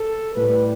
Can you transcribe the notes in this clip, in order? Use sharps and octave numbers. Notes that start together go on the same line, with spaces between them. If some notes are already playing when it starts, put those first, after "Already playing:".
Already playing: A4
A2 G3 B4